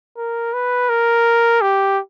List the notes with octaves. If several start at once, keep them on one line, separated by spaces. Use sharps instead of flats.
A#4
B4
A#4
G4